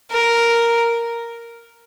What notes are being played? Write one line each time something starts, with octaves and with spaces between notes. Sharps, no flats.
A#4